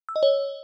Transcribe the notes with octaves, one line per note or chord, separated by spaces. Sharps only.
E6
D#5
C#5